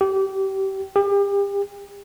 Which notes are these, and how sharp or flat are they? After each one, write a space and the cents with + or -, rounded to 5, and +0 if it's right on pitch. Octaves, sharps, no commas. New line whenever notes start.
G4 -25
G4 +35